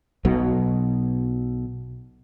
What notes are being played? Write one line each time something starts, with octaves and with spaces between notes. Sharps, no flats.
B1 B2 F#3